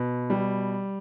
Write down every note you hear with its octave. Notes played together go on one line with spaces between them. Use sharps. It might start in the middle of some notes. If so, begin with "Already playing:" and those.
Already playing: B2
G3